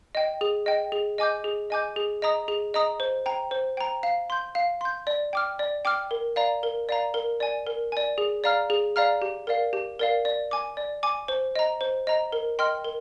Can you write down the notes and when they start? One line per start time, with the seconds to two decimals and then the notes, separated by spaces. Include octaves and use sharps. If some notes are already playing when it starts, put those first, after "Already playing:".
0.15 D#5 G5
0.41 G#4
0.66 D#5 G5
0.92 G#4
1.18 D#5 G#5 D6 G6
1.44 G#4
1.70 D#5 G#5 D6 G6
1.96 G#4
2.22 D#5 A#5 D#6
2.48 G#4
2.74 D#5 A#5 D#6
3.00 C5
3.26 G5 A#5
3.51 C5
3.77 G5 A#5
4.03 F5
4.30 C6 G6
4.55 F5
4.81 C6 G6
5.07 D5
5.33 G5 D6 F6
5.59 D5
5.85 G5 D6 F6
6.11 A#4
6.36 D5 F5 A#5
6.63 A#4
6.89 D5 F5 A#5
7.14 A#4
7.40 D5 G#5
7.67 A#4
7.92 D5 G#5
8.18 G#4
8.44 D5 F5 A#5 F6
8.70 G#4
8.96 D5 F5 A#5 F6
9.22 G4
9.47 A#4 D5 F5
9.73 G4
9.99 A#4 D5 F5
10.25 D5
10.51 G#5 D6
10.77 D5
11.03 G#5 D6
11.28 C5
11.56 D#5 A#5
11.81 C5
12.07 D#5 A#5
12.32 A#4
12.59 D#5 G5 C6 F6
12.85 A#4